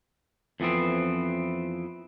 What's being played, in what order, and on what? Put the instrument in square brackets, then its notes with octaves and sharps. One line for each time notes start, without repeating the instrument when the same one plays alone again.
[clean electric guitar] F2 E3 B3 C4